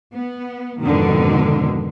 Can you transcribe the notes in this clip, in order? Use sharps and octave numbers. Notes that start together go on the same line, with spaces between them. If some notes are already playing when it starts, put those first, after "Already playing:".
B3
F2 G#2 B2 D3 D#3